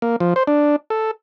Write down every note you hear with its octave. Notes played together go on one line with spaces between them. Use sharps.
A#3
F3
C5
D4
A4